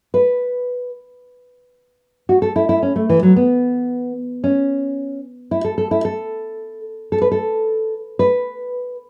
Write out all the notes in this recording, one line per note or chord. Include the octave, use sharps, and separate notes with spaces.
B4
F#4
A4
E4
E4
C#4
A3
E3
F#3
B3
C#4
E4
A4
A4
E4
A4
A4
B4
A4
B4